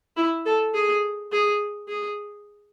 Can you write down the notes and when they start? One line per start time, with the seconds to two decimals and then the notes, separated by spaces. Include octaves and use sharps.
0.17 E4
0.46 A4
0.74 G#4
1.32 G#4
1.88 G#4